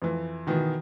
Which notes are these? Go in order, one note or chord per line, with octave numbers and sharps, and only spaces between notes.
F2 E3
B2 D#3 E3